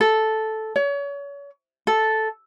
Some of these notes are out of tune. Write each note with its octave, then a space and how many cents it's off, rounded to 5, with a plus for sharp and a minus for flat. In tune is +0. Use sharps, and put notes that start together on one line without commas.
A4 -5
C#5 +35
A4 -5